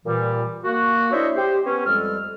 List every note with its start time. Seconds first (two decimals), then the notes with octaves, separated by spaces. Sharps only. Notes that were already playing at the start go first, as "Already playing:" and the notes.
0.05 A#2 E3 G3
0.65 A#3 F#4
1.12 D4 E4 C5 C#5 D#5 E5
1.36 G4 C5
1.65 B3 C#4
1.85 F2 G3 G#3 A4 F6